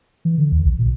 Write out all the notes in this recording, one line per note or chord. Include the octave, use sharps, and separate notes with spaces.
E3
D3
D#2
B1
A#2